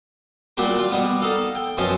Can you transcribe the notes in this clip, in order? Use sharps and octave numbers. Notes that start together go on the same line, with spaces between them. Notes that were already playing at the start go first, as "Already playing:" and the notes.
A#2 F#3 G3 D4 G4 C6
F4
B2 G3 B3
D#4 A4 F5
G5
F#2 B2 F3 C#4 A5 C6